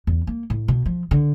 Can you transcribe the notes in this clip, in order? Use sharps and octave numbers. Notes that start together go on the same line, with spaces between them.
E2
A#3
A2
B2
F3
D3